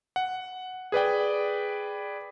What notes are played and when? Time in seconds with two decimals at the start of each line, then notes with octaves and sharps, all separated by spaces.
0.16 F#5
0.92 G#4 B4 D5 G5